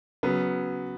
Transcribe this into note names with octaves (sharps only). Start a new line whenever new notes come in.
C#3 F#3 B3